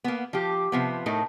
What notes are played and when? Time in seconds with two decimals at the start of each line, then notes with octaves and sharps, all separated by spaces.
0.04 A#3 B3
0.33 F3 G4
0.72 C3 F3 B3
1.06 A2 A3 D#4 A#4